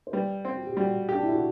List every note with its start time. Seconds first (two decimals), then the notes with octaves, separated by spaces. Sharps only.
0.07 C5
0.13 G3 B4
0.45 C4
0.56 F#4
0.67 G4
0.77 G3 F#4
1.09 G4
1.14 D4
1.23 E4
1.32 F#4